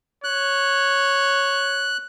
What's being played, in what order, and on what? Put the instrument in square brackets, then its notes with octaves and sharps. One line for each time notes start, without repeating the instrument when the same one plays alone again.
[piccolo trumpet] C#5 [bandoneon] F#6